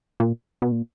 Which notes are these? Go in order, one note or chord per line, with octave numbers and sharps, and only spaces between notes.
A#2
B2
A#2